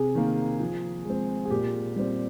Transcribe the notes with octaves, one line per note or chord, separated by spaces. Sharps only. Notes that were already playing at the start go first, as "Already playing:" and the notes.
Already playing: C3 G#4
D#3 A#3
F3
G#3 C4
G#4
A#2 G4
G3 C4